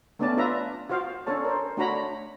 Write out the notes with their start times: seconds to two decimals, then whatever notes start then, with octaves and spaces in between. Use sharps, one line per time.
0.19 A3 B3 C#4 D4 D5 A5
0.37 D4 F4 B4 E5 A#5
0.89 F4 F#4 C5 F5
1.27 C#4 D4 A4 C#5 A5
1.45 A#4 C5
1.77 A3 D4 F#4 C#5 A#5 B5